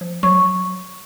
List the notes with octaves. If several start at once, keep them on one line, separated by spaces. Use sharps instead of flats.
F3
F#3 C#6